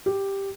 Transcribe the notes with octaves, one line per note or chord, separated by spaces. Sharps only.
G4